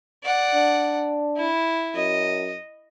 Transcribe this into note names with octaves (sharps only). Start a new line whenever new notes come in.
D5 F#5
D4
E4
F#2 D#5